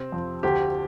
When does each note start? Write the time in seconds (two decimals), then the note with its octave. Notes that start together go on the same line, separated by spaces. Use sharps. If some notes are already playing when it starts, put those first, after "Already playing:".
Already playing: C3 C4
0.12 F2
0.43 D2 G4